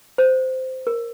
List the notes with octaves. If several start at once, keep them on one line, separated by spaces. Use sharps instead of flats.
C5
A#4